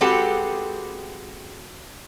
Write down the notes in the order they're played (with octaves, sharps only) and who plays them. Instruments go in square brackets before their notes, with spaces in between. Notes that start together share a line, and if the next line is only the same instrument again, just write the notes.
[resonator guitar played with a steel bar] G#3 C4 F#4 G4 A4 B4